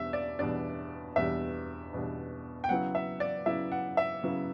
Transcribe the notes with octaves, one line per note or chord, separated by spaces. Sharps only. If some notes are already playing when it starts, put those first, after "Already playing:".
Already playing: E2 B2 G3 D4 E5
D5
E2 B2 G3 D4 D5
E2 B2 G3 D4 E5
E2 B2 G3 D4
G5
C#3 F#3 B3 E4 F#5
E5
D5
C#3 F#3 B3 E4 E5
F#5
E5
C#3 F#3 B3 E4